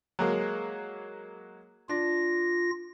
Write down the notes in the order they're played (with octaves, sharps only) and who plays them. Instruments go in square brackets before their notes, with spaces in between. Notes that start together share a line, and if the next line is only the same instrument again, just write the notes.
[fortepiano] F#3 G#3 A#3
[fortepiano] D4 [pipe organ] F4 A#6